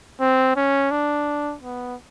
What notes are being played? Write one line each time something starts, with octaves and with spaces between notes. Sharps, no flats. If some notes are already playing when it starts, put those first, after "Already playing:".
C4
C#4
D4
B3